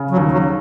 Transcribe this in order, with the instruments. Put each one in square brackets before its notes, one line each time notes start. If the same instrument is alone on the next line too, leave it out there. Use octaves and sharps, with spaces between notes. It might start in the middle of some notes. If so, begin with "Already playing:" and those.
Already playing: [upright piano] C#3
[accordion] F#3
[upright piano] D#2
[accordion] F#3